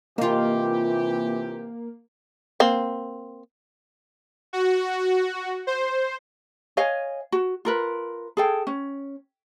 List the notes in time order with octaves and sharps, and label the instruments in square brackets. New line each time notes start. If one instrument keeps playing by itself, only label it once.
[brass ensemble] C3 E3 G4 [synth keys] A#3 [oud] D#4 F4
[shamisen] A#3 C4
[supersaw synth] F#4
C5
[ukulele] C#5 D#5 F5 G#5
F#4
F4 A#4 B4
G#4 A4 G5
C#4